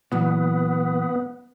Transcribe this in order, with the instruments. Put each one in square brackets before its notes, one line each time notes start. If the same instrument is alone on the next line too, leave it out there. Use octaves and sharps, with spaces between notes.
[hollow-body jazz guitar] A#2 E3 F#3 [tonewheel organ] B3